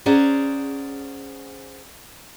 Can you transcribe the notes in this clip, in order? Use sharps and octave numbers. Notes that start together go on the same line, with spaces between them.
C#4 G#4 C5 D5 F#5 A#5